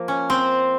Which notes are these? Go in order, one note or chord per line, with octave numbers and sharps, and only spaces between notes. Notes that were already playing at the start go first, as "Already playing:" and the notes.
Already playing: F3 A#3
C#4
C4